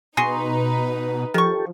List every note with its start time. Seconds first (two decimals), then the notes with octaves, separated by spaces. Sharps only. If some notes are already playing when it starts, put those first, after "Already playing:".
0.17 B2 D#4 F#4 G#4 B4 C6
1.34 D#3 F3 G4 A4 C#6